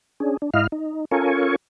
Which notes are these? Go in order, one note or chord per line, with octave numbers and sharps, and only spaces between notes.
C#4 D4 G#4
D4
G#2 E4 D#5 F5 F6
D#4
C#4 F4 A4 A#4 G#5 C#6